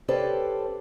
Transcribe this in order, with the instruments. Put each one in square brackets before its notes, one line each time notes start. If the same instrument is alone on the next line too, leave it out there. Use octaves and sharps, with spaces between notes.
[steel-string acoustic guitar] C#4 G4 A4 B4 C5 D5